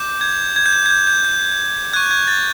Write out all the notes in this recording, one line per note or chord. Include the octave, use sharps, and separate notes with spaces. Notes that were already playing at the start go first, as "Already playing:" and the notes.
Already playing: D6 G6
G#6
G#6
G6
G#6
G#6
G6
G6
G6
C#6 F#6 G#6
G#6
A6